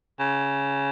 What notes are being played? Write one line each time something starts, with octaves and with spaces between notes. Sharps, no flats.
C#3